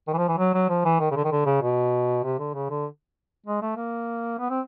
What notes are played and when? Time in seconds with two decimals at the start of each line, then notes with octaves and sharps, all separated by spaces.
0.08 D#3
0.13 E3
0.18 F3
0.29 E3
0.38 F#3
0.54 F#3
0.70 F3
0.85 E3
1.00 D#3
1.11 C#3
1.16 D3
1.25 D#3
1.32 D3
1.46 C#3
1.62 B2
2.24 C3
2.39 D3
2.54 C#3
2.70 D3
3.47 G#3
3.62 A3
3.77 A#3
4.39 B3
4.50 C4